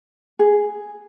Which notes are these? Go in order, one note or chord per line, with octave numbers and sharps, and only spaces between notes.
G#4